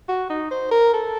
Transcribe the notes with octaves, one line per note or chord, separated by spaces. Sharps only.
F#4
D#4
C5
A#4
A4